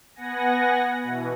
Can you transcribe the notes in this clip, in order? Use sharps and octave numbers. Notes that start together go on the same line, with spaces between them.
B3 F#5 G#5 A#6
B2 E3